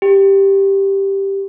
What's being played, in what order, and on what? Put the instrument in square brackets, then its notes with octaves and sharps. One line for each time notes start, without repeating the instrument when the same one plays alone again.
[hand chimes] G4